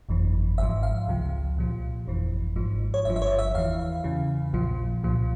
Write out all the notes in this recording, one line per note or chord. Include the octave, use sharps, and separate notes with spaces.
G1 F2 E3
G#1 G#2 F3 E5
F5
C#2 C3 F3
C2 A#2 F3
G1 F2 E3
G#1 G#2 F3
C#5
G1 G2 F3 E5
E5
C#5
E5
E2 E3 F5
E2 C#3 E3
A#1 A#2 F3
C2 A#2 F3